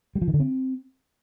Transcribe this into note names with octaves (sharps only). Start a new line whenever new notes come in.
G3
F3
D#3
D3
C4